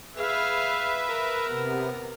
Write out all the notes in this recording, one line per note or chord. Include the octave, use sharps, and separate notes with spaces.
G#4 B4 E5 F5
A#4
C3 B3